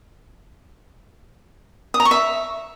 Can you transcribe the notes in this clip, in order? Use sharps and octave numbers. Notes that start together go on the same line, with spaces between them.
D#6
A#5
C#6
E5